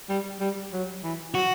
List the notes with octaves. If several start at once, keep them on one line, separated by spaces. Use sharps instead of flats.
G3
G3
F#3
E3
F#3 F#4